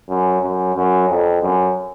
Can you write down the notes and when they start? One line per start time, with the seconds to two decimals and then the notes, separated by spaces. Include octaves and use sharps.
0.09 F#2
0.42 F#2
0.75 F#2
1.09 F2
1.41 F#2